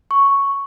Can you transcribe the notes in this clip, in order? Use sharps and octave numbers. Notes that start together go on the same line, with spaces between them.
C#6